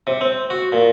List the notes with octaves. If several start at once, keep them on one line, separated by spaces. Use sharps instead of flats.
C3
C4
F#4
A#2